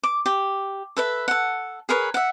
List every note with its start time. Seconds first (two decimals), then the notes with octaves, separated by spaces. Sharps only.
0.03 D6
0.26 G4
0.97 A4 B4 E5
1.28 A4 F#5
1.89 G#4 A#4 B4 C#5
2.14 E5 F#5